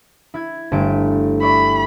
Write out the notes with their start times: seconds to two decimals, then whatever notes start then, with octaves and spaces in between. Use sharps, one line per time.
0.34 E4 G#6
0.72 G1 A3 D7
1.42 D5 E5 B5 C#6